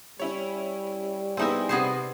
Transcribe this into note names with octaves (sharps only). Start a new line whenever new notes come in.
G3 C#4 E4 C#5
B3 C4 D#4 E4 G#4 E5
C3 B3 G#4 C5 B5 C7